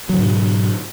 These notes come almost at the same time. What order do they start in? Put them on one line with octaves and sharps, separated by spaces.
F#3 D3 G#2 B2